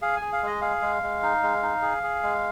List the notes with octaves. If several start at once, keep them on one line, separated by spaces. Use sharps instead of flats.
G#4 F5
G#4 G#5
F5
G#3 D#5
G#4 F5
G#3
G#3
D#4
G#3
D#4
G#4
G#4
G#3